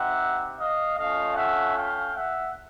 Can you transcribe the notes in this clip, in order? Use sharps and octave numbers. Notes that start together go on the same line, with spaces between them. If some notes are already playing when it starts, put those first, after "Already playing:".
Already playing: C4 D#4 G4 E5 F#5
D#5 F5
A3 C#4 F4 D#5 F5
E5 F#5
F5 G5
E5 F#5